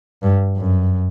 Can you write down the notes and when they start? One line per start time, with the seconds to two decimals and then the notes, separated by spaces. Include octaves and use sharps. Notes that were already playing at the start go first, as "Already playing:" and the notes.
0.23 G2
0.57 F#2